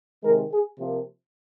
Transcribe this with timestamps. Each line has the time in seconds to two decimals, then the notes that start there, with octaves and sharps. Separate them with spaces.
0.23 C3 D#3 G#3 A#4
0.52 G#4
0.80 C3 F3 A#3